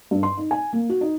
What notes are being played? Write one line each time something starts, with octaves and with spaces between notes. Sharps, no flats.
G2
C6
D#4
G#5
A#3
F#4
D#4